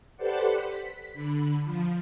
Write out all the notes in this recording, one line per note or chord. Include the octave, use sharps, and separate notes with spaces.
G4 A4 B4 C5 D5 F#5
B6
D3 B5
F3